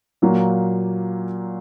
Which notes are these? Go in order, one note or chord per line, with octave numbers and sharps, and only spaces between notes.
A#2 F#3 A#3